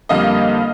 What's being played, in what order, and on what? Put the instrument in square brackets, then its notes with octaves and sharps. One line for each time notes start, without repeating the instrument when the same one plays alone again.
[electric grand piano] F2 D3 G3 A#3 [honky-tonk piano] D#5 F5